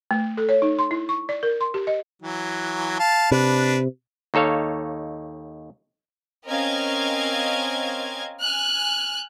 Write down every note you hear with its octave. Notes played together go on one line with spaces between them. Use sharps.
A3
A4
C#5
D#4
C6
E4
C#6
D5
A#4
C6
G4
D#5
E3 F#3
F5 A5
C3 D4 B4
D#2 D#4 A4 C#5 F5
C4 C#4 A#4 D#5 F5 G#6
G#5 F6 F#6